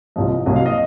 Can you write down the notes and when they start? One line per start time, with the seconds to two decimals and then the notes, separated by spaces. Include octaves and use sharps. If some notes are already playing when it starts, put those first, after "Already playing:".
0.16 C2 C3 F3 D#5
0.46 C2 C3 F#3 A#3 D#5
0.56 F5
0.66 D#5